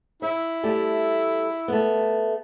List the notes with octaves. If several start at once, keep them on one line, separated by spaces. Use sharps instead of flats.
E4 E5
G3 A3 G4
A3 B3